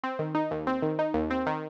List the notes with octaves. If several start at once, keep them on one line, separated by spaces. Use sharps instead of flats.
C4
D#3
D#4
D#2
C4
D#3
D#4
D#2
C4
D#3